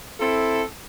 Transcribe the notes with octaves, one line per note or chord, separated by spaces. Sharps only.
C4 E4 A4